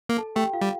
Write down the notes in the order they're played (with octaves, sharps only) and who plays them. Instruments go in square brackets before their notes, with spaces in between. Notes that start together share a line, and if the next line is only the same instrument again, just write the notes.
[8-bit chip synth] A#3
[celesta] A4 A5
[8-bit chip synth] A3 [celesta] G4 G5
[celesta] F4 F5
[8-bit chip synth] G3